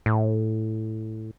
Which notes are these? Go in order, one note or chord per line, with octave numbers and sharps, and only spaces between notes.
A2